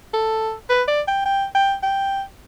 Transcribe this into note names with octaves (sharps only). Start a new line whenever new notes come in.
A4
B4
D5
G5
G5
G5
G5